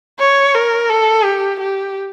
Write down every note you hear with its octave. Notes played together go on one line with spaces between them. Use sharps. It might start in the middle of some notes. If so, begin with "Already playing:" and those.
C#5
A#4
A4
G4
G4